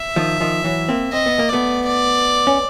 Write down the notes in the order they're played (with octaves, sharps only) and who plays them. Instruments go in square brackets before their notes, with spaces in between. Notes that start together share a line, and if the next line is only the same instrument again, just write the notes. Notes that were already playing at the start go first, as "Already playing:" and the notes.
Already playing: [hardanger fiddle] E5
[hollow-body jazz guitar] D#3 F3
D#3 F3
E3 F#3
A#3 C4
[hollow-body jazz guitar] C4 [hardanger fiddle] D#5
[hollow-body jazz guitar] B3
A#3
[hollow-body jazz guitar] A3 B3 [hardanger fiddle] D5
[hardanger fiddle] D5
[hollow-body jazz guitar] C#4